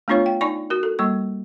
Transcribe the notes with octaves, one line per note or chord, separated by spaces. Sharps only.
A3 B3 D4 F4 C#5 F5
G5
D#4 D5 G#5 C#6
F#4 A#4
A4
G3 A#3 C#6